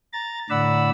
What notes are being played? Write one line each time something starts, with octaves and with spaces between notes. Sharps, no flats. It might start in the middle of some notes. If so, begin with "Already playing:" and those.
A#5 A6
A2 D3 D5 F#5 B5 E6